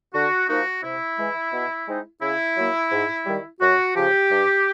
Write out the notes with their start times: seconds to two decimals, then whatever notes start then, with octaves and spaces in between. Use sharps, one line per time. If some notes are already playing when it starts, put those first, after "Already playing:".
0.13 D3 F#4
0.48 F3 A#3 D#4 F#4
0.83 C3 E4
1.18 E3 G#3
1.52 B2
1.87 G#3 C4 D#4
2.21 C#3 E4
2.56 F#3 A#3
2.91 G#2
3.26 D#3 G3
3.61 F#2 F#4
3.95 C#3 F3 G4
4.30 G2